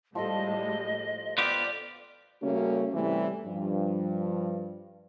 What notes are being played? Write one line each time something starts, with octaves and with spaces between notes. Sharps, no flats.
A2 F3 G3 G#3 A4 D#5
B3 F4 G4 D5
C#3 G3 A3 A#3 C#4 F#4
A2 C3 E3 G3 A3
G2 F3